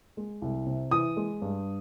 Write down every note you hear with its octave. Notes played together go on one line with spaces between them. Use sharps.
G#3
C2
C3
E3 D#6
G#3
G2